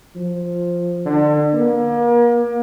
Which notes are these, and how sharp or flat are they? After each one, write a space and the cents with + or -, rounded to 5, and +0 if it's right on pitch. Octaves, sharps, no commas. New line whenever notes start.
F3 +5
D3 +30
A#3 +35